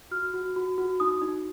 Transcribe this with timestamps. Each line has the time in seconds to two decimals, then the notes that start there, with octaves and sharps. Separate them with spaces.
0.11 F#4 F6
0.33 F#4
0.56 F#4
0.78 F#4
1.00 D#4 D#6
1.22 D#4